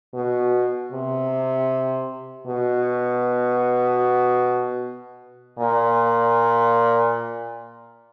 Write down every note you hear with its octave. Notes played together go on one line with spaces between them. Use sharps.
B2
C3
B2
A#2